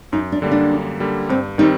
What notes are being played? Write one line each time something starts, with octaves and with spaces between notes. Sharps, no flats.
F#2 D#4
D4
D3 G3 A#3
D4
F#2
D3 G3 A#3
G2 C4
D#3 G3 C4 D#4